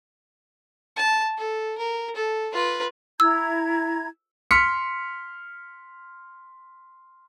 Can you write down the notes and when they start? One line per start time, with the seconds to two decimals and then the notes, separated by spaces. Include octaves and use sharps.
0.96 A5
1.37 A4
1.78 A#4
2.16 A4
2.53 F4 B4
3.20 E4 A#5 E6 G#6
4.51 C6 F6 B6 C#7